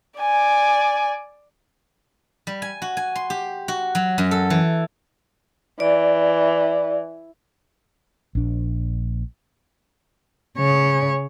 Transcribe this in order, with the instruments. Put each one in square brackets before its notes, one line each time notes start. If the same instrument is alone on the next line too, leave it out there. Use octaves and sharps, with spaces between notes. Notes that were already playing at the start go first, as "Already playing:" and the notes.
[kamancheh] D5 G#5
[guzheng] G3
G#5
F#4
G#5
C6
G4
F#4
F#3
F#2
A4
E3
[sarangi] E3 [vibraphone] D5
[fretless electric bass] A#1 D4
[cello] C#3 C#5